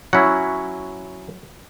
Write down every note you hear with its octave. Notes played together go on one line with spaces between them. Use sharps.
F#3 C#4 E4 F#5